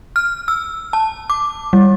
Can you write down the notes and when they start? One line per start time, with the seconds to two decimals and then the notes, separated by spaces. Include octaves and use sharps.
0.16 F6
0.48 E6
0.93 A5
1.30 D6
1.73 G3